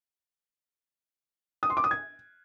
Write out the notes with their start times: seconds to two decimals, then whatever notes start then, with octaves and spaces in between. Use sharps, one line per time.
1.63 D#6
1.70 C6
1.77 D6
1.84 D#6
1.91 G#6